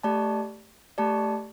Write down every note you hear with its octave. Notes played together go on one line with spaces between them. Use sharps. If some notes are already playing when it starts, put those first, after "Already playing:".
A3 G4 D5 A5
A3 G4 D5 A5